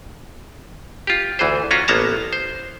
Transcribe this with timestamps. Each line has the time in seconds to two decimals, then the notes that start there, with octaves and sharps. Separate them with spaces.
1.07 F4 G4
1.39 D2 E3 G#4 C5
1.71 C#4 F4 F#4 A#5
1.88 A1 A#3 B3 A5 A#5
2.33 C5